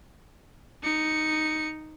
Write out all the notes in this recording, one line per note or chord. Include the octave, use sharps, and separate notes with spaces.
D#4 C#7